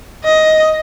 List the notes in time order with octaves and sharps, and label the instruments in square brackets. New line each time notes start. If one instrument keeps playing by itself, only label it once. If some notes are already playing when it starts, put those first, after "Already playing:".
[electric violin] D#5